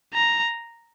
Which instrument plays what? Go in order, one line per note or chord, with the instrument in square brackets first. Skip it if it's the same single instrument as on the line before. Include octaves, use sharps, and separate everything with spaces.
[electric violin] A#5